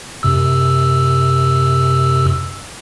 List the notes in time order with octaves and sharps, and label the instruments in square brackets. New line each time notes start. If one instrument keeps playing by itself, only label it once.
[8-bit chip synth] F#2 C3 E6